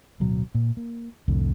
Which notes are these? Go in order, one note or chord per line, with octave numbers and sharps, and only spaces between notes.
D1 B2 F#3
A#2
A#3
C2 F2 A2 D3